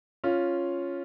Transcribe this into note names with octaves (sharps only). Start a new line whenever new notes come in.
C#4 F4